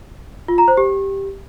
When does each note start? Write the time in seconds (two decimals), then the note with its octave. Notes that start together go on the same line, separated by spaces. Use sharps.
0.48 F4
0.58 A#5
0.68 C5
0.77 G4